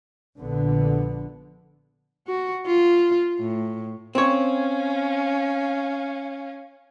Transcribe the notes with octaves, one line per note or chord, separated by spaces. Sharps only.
A#1 D3 B3
F#4
F4
A2
C4 C#4 C#5 F5